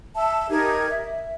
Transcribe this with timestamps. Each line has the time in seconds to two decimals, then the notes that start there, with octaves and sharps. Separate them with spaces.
0.16 E5 A5 E6
0.50 D#4 G4 A#4 G#6
0.90 E5